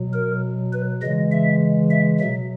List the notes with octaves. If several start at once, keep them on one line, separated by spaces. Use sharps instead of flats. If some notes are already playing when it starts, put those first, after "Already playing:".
Already playing: B2 F#3
A#4
B4
C#3 E3 G#3 D#5
E5
E5
B2 F#3 E5